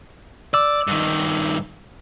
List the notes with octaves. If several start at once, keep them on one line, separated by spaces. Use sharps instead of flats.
D5 D6 E6
G2 D#3